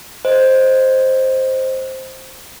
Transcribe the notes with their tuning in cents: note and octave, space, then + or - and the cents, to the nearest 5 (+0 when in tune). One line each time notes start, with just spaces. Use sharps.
C5 +0 D#5 +0